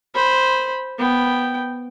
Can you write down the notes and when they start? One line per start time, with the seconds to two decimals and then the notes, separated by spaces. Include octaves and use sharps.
0.15 C5 B5
0.99 B3 G5